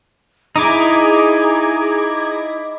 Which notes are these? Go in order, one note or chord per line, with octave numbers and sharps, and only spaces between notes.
D#4 E4 G#4 A#5 D6 G#6